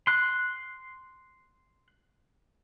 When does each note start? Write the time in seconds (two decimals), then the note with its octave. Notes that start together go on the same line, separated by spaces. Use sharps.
0.07 C6 F#6